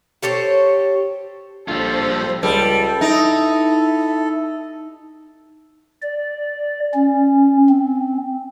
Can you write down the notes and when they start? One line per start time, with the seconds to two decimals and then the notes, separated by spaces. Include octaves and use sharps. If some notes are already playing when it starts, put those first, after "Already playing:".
0.22 G4 A4 C5 C#5
1.68 A#1 G3 F4 A4 C5
2.43 C#2 G3 A4
3.01 D#4 E4
6.02 D5
6.94 C#4
7.69 C4